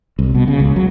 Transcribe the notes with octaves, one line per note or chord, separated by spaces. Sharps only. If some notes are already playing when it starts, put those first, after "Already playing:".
C2
B2
C#3
C#2
F#3